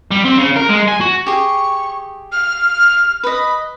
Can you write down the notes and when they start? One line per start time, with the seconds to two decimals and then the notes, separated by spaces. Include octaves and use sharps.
0.11 G3
0.25 C4
0.37 C#3
0.56 A#4
0.69 G#3
0.88 G#5
1.00 F#4
1.26 G4 G#4 C#6
2.32 F6
3.23 B4 D#5 B5